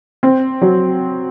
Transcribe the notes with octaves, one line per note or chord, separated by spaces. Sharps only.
C4
F#3